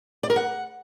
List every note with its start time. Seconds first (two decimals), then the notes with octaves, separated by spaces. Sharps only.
0.23 D5
0.30 A#4
0.36 F#5